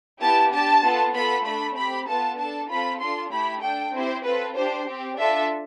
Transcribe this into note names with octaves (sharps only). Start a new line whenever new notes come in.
B3 E4 G4 A5
D4 G4 A5
B3 F4 A4
B3 F4 A4 B5
A3 D4 A4 B5
C4 G4 B5
B3 F4 A4 A5
D4 A4 A5
C4 F4 A4 B5
D4 F4 A4 C6
A3 E4 G4 B5
D4 A4 G5
C4 E4 G4 C5
C4 F4 A4 B4
D4 G4 C5
C4 G4
D4 F4 A4 E5